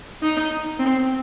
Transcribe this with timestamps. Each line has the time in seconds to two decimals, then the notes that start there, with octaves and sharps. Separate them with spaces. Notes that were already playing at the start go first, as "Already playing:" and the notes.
0.22 D#4
0.79 C4